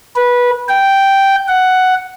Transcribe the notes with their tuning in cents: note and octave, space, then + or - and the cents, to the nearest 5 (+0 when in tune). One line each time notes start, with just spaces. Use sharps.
B4 -15
G5 -5
F#5 +5